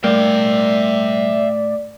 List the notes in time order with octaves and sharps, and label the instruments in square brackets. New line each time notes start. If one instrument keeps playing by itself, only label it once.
[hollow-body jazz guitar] A2 A#3 [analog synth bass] G3 [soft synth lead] D5 [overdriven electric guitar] E5 G5